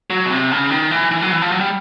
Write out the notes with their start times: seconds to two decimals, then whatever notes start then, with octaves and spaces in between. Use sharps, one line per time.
0.10 F#3
0.25 B2
0.30 C3
0.51 C#3
0.70 D#3
0.91 E3
1.11 E3
1.22 F#3
1.32 E3
1.42 F3
1.52 F#3
1.61 G3